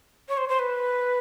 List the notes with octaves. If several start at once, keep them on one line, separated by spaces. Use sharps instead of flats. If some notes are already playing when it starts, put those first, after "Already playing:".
C#5
C5
C5
B4